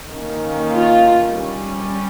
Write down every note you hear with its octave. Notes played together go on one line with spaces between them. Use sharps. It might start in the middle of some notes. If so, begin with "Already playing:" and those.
D#3 A#3 C#4
F4
G3 C#4